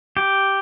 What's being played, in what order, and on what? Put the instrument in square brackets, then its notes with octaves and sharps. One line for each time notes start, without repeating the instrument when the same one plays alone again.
[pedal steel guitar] G4